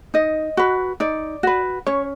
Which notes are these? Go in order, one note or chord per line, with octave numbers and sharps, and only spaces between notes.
D#4 D#5
F#4 B4
D#4 D5
F#4 B4
C#4 C#5